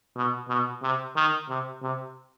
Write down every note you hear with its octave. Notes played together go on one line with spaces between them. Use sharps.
B2
B2
C3
D#3
C3
C3